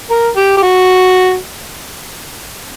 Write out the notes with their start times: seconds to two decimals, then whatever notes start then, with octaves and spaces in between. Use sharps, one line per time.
0.10 A#4
0.36 G4
0.57 G4
0.62 F#4